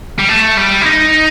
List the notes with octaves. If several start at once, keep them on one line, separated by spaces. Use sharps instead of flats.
G3
A3
G3
E4
D#4